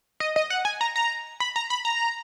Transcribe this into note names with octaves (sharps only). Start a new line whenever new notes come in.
D#5
D#5
F#5
G#5
A#5
A#5
B5
A#5
B5
A#5